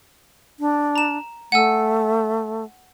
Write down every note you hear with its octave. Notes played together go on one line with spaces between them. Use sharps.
D4
A#5 E7
A3 F#5 G#5 E6